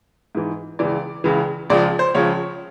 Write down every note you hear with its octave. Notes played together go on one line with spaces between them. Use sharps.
G#2 E3
C#2 C#3 E3 D5
C#2 C#3 E3
C#2 C#3 F3 D5
C5
C#2 C#3 F3 C#5